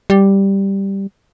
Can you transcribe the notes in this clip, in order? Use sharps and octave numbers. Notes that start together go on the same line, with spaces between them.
G3